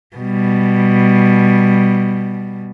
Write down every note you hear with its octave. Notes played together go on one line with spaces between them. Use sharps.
B2 G3